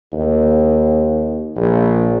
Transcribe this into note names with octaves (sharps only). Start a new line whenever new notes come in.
D#2
A#1